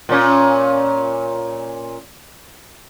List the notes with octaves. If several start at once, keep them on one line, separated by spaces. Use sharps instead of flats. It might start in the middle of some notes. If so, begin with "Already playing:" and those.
A#2 C#4